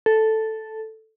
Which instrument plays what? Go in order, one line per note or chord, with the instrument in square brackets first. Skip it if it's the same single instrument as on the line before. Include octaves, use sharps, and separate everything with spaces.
[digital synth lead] A4